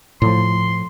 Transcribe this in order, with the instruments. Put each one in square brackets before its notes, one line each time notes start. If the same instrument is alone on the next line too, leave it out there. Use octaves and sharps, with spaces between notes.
[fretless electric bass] A2 F3 [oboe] C6